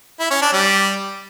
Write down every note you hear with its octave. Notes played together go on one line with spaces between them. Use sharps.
E4
C#4
D4
G3